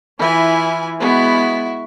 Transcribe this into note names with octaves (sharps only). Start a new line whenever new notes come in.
E3 E4 F4 G#5
G#3 B3 E4 F#4